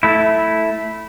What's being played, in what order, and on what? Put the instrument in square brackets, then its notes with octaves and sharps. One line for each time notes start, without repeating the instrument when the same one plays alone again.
[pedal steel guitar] A3 E4